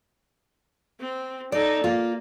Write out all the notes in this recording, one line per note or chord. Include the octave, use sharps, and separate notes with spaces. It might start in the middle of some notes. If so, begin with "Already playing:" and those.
C4
D#4 A4 D5
A#3 F4